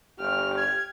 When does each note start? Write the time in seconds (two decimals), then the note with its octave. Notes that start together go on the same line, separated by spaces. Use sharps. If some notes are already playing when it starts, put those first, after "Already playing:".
0.19 G1 G4 F6
0.57 G#6